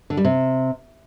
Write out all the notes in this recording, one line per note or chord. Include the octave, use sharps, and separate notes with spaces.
D3
G3
C3